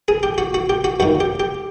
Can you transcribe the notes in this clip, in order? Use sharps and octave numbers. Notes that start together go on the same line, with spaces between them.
G#4
G4
F#4
F#4
G4
F#4
F#2 D#3 F#4
G4
G4